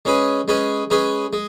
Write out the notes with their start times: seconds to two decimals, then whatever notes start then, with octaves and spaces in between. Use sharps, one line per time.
0.05 G#3 C#4 G#4 B4
0.48 G#3 C#4 G#4 B4
0.90 G#3 C#4 G#4 B4
1.33 G#3